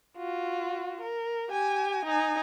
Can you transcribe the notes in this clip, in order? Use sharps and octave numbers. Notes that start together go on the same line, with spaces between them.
F4 F#4
A#4
G4 G#5
D#4 G#5